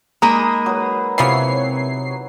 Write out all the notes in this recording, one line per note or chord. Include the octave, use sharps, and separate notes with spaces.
G#3 A#3 D#4 A#5 B5 D#6
F#3 B4
C3 E3 F3 B3 C#5 C7